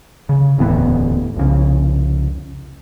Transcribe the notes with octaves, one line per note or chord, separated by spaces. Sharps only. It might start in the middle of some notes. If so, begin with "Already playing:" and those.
C#3
D1 E2 A2 B3
C2 F2 C#3